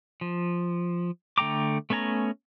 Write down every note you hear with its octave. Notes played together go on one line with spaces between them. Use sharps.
F3
D3 A3 G5 A#5 D6
A3 B3 C#4 G#5 A#5